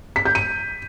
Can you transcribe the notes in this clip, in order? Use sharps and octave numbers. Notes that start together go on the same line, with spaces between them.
B6
G6
D#7